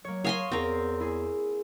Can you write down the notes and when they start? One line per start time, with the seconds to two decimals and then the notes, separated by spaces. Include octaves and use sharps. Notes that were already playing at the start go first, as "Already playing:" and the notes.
0.05 F#3 A#3 C#5
0.24 C#5 F5 G#5 C6 D#6 A#6
0.52 E2 C4 A#4
1.00 E4 G#4